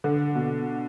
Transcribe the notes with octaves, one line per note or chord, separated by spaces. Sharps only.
D3
B2